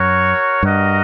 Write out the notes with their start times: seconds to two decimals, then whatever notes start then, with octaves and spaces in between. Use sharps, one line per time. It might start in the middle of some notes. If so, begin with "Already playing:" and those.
Already playing: F#2 F#4 A#4 C#5
0.62 G2 F#4 A#4 D#5 F#5